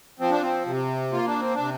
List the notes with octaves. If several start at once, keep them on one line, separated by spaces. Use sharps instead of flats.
F3 C4
D4
C4
C3
A#3 F4
D4
C4
C3 D4